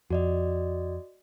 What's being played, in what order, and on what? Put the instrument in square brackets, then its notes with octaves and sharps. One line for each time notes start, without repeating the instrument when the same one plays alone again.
[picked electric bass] F2 [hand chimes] F#4 D5 D#5